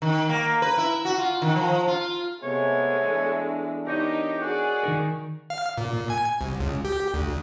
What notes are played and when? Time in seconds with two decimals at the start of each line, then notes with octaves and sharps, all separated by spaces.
0.02 D#3
0.29 A#3
0.62 B4
0.78 E4
1.05 F#4
1.18 F4
1.42 D#3
1.56 F3
1.87 F4
2.43 C3 G#3 A3 B3 C#5
3.03 E3 B3 D4
3.87 D#4 G4 A#4 C#5 D#5
4.40 F#4 G#4 D5
4.83 D#3 D#4 A#4
5.50 F5
5.78 A#2
6.10 G#5
6.41 C2
6.60 C#2
6.85 G4
7.14 D2